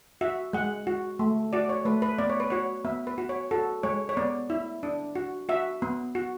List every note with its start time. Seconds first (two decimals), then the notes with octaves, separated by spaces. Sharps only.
0.21 F#4 E5
0.53 G#3 F#5
0.87 F#4
1.19 A3
1.53 F#4 D5
1.69 C#5
1.85 A3 B4
2.02 B4
2.18 B3 D5
2.30 C#5
2.40 B4
2.50 F#4 C#5
2.85 B3 E5
3.07 B4
3.18 F#4
3.29 C#5
3.51 F#4 A4
3.83 G#3 C#5
4.09 C#5
4.17 B3 D5
4.50 E4
4.83 D4
5.16 F#4
5.49 F#4 E5
5.82 B3
6.15 F#4